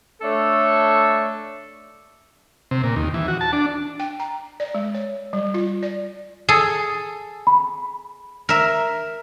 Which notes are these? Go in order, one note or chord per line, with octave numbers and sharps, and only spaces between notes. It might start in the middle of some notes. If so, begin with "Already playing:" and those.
A3 D4 A4 C#5 E5
C3
A#2
D#2
E3
F#4
A5
D4
G5
A#5
D5
G#3
C#5
G3
F4
D5
G#4 A4
B5
A#4 E5